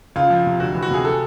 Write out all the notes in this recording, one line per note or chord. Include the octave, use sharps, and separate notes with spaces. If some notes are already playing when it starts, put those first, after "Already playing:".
C#2 F4
F3
C3
D2 F#4
E3
F#4
C3 G#4
A4